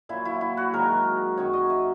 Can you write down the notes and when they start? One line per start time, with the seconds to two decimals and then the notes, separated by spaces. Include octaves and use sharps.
0.09 A#2 F#3 E4
0.25 E4
0.41 E4
0.57 F#4
0.73 G#2 D#3 F#3 A#4
1.37 F#2 D#3 F#3 C#5
1.53 D#5
1.70 E5